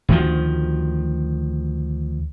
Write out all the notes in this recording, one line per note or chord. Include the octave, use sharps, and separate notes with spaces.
D2 D#3 F3